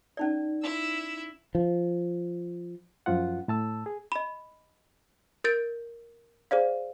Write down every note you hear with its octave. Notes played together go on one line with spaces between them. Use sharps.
C#4 D#4 D5
E4 E6
F3
F#2 F3 F4 F#5
A2 A5 E6
G#4
D#5 B5
A#4 G6 A6 D7
G#4 C5 D5 F5